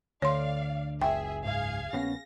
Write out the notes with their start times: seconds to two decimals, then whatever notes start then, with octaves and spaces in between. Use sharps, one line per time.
0.22 D2 D3 C#5 D5 F5 C6
1.01 F#1 C#2 G#4 E5 G5
1.44 G#2 G#4 F5 G#6
1.93 A#1 B3 C#4 A#6